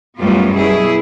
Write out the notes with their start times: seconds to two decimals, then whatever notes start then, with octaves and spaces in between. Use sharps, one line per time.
0.19 F#2 A2 G3 B3 F4
0.56 B2 E4 G#4